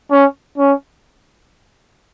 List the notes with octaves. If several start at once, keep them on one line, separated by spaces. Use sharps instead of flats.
C#4
C#4